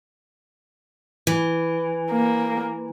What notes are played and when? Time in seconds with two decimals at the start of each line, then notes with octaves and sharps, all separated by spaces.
1.27 E3
2.12 A#3